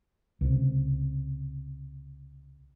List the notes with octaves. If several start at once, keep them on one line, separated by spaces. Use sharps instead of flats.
C#2 C3